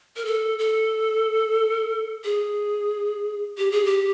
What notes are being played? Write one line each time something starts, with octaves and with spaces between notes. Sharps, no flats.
A#4
A4
A4
G#4
G4
G#4
G4